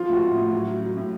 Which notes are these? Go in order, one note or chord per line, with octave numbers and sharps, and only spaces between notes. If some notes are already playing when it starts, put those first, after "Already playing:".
Already playing: F3 F4
A2 F#4
A2
A2
F#3
F#3
F#3
A2